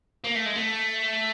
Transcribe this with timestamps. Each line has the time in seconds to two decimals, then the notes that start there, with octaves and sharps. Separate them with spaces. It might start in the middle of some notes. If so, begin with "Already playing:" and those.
0.24 A#3
0.35 A3
0.45 G#3
0.56 A3